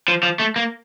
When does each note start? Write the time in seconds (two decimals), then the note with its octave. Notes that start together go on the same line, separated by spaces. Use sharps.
0.08 F3
0.23 F3
0.40 A3
0.56 A#3